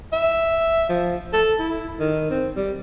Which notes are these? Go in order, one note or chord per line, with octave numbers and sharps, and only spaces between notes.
E5
F3
A4
E4
D#3
C4
G3